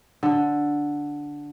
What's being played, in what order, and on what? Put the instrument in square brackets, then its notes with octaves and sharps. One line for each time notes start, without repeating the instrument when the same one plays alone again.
[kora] D3